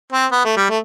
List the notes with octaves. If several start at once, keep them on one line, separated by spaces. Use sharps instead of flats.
C4
B3
A3
G3
A3